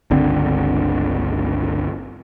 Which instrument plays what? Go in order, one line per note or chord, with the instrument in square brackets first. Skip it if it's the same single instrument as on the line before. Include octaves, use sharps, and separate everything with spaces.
[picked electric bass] G1 C#2 D3 C4